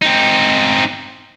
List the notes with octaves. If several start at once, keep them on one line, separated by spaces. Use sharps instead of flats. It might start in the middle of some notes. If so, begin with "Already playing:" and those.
C4 D#4